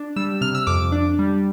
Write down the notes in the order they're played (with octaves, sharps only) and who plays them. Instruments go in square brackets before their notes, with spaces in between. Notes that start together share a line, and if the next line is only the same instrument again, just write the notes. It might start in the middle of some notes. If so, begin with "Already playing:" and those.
Already playing: [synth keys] D4
G3 E6
C3 F6
E6
F2 D6
D4
G3